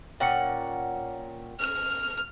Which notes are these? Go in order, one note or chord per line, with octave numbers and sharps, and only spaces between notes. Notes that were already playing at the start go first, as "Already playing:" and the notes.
A#2 C#4 F#5 G5 C#7
F6